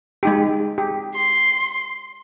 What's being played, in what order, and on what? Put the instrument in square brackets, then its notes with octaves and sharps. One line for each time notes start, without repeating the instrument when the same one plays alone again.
[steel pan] G#3 D#4 G4
G4
[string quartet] C6